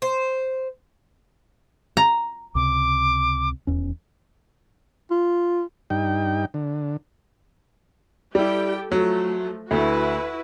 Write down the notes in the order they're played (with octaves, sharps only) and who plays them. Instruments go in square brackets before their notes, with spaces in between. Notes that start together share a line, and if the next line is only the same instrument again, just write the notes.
[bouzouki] C5
[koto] A#5
[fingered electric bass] C#2 C3 [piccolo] D6
[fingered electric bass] D#1 E2 C#4
[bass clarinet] F4
[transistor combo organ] G2 D#4 G5
D3
[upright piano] G3 E4 [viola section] G4 A4 G5
[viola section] F3 A3 [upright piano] F#3
[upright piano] D2 [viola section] E4 F#4 B4